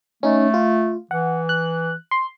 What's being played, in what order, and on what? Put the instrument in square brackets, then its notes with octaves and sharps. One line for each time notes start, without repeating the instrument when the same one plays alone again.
[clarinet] A3 [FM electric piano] C#4 D#4
[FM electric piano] F4
[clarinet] E3 [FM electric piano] F#5
[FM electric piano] F#6
C6